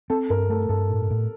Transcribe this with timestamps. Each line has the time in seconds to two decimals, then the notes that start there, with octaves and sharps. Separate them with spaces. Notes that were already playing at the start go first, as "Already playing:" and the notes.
0.10 C4 A4
0.30 G2 A#4
0.50 A3 A4
0.69 G2 A4
0.90 A2
1.10 A2